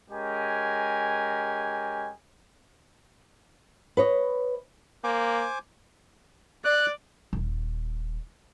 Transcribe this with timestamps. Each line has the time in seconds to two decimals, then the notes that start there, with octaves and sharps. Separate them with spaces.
0.11 G#3 C#4 G4 A#4 G#5
3.97 B4 C#5 D#5
5.04 A#3 C5 G#5 D6
6.65 D5 F#6
7.33 D#1 G#1